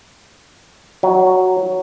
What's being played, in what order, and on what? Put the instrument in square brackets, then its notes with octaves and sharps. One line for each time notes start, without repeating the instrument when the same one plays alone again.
[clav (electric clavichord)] F#3